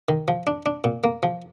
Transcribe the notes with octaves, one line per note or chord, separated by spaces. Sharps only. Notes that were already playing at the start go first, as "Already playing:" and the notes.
D#3
F3
D4
D4
A#2
A#3
F3